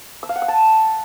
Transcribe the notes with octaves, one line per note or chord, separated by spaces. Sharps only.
E6
F5
F#5
E6
A5